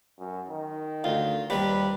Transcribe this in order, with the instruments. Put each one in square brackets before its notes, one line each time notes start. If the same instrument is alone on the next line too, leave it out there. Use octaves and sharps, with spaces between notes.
[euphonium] F#2
D#3
[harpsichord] D2 [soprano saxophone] F4
[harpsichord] D#2 G3 [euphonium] C3 [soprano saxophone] B4